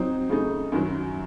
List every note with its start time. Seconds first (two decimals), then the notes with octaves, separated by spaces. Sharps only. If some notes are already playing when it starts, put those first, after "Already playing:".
Already playing: F#3 C4 D#4
0.30 C#3 A3 D#4
0.72 F#2 D#3 F#3